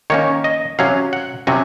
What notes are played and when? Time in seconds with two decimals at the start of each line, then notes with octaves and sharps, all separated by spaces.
0.10 D#3 A#3 C#4 C#5
0.44 D#5
0.79 C3 F#3 C#4 F5
1.13 F#5
1.47 C3 F#3 C#4 G#5